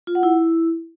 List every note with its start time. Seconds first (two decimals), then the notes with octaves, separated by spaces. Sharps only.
0.07 F4
0.15 F#5
0.23 E4